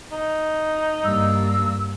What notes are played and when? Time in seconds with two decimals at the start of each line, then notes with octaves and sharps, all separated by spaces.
0.12 D#4
1.04 G2 A#3 E6